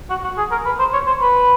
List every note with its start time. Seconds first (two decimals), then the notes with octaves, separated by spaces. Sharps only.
0.10 F#4
0.24 F#4
0.38 G#4
0.52 A#4
0.65 B4
0.79 C5
0.93 C#5
1.07 C5
1.21 B4